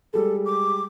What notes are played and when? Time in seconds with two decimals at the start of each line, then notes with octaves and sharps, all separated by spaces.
0.14 G3 G#3 A4
0.45 D6